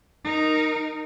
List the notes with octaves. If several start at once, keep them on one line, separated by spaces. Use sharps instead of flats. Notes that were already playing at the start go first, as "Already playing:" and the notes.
D#4 A#4